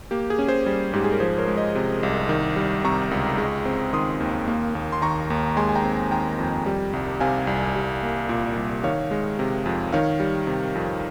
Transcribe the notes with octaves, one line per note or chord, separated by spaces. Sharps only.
A#3 G4
G#4
C#4
G#4 C5
G3
G#2 G4
G#4
A#4
F3 G#4 C5
A#4 C#5
G#3
C5 D#5
C3
C2
D#3
G3
C3 A#5 C#6
C#2
G#3
C4
D#3 C6 D#6
D#2
A#3
D#2
C6
D#3 A#5 C#6
D#2
G#3 G#5 C6
G#5
G5 A#5
C4
D#3 G5 A#5
F2
G3
C2
C3 F5 G#5
C2
G3
A#3
A#2
C2
D#3 C#5 F5
G#3
C3
F2
D#3 C#5 F5
G3
C3
F2